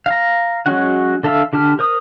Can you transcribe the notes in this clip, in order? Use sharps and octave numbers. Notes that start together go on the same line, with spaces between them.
F5 A#5
F#3 G#3 C#4 F#4 F#5
D3 A4 E5 F5 E6
D3 G4 A5 F6
A#4 C5 D#6